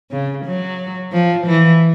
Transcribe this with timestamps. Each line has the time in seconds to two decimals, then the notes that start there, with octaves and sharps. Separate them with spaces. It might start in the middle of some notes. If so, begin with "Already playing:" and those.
0.11 C#3
0.45 F#3
1.12 F3
1.46 E3